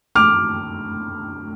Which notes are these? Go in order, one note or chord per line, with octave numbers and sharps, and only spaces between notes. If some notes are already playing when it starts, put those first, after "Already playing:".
D6 F6